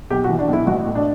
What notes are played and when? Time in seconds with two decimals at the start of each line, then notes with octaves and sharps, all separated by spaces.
0.11 B1 G4
0.24 F#4
0.29 E3
0.39 D4
0.48 B1
0.53 E4
0.67 A1 F#4
0.86 A2
0.95 D4